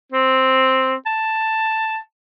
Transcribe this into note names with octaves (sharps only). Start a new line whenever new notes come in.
C4
A5